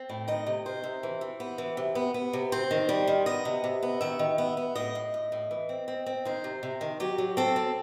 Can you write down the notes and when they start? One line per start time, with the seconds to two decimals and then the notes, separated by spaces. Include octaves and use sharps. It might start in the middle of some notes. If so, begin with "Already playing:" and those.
Already playing: C4
0.10 A2
0.28 D#3 D#5
0.46 C3
0.66 D#3 C5
0.84 C3
1.03 E3
1.21 E3
1.40 B3
1.58 E3
1.77 C3
1.95 B3
2.14 B3
2.33 C3
2.52 C4 C5
2.71 D#3
2.89 G3
3.07 D#3
3.26 B3 D#5
3.45 C3
3.64 C3
3.83 B3
4.01 D#3 E5
4.19 D#3
4.38 B3
4.57 B3
4.75 A2 D#5
4.95 A2
5.14 A2
5.32 A2
5.51 E3
5.69 C4
5.88 C4
6.06 C4
6.25 D#3 C5
6.44 C3
6.63 C3
6.81 D#3
7.00 F#3 G4
7.18 F#3
7.37 C4 A4
7.56 C4